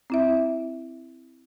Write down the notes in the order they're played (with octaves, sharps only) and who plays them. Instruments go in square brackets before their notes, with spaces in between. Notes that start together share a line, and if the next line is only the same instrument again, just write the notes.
[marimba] C4 E4 E5